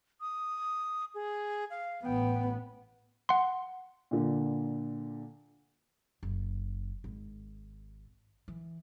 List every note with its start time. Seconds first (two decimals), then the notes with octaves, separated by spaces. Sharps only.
0.21 D#6
1.15 G#4
1.70 F5
2.04 A1 B3 G5
3.29 F#5 C6
4.11 A#2 D3
6.23 F#1
7.04 G#1
8.48 E3